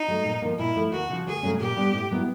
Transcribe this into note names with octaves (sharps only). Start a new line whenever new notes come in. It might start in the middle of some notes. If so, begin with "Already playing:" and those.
Already playing: D#4
F#3 A3
A#2
F3 A#3
A#2 E4
F3 A3
D#2 F#4
C#3 F3
D2 G#4
C#3 F#3 A3 C#4
A#2 G4
G3 B3 D4
A2
F#3 B3 E4